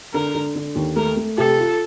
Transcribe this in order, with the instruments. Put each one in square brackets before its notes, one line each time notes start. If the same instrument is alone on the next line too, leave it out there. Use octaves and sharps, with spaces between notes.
[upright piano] D3 [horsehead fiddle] A#4
[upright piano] D3
D3
D#2
[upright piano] A3 [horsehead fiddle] A#4
[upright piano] A3
[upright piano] C3 [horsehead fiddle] A4
[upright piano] F4